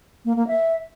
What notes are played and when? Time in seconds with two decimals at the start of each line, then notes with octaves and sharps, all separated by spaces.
0.25 A#3
0.36 A#3
0.48 E5